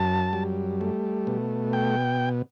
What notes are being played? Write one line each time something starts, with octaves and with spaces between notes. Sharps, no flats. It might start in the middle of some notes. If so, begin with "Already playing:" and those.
Already playing: F#2 A5
G3
A3
B2
G5